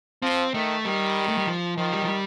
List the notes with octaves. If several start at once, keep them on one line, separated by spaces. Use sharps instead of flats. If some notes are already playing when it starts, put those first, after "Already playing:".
F3 C4
D#3 A3
D#3 G3
A3
G3
F3
D#3 F3
G3
F3
G3